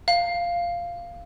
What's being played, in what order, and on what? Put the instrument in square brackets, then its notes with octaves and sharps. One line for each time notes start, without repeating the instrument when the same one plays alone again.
[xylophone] F5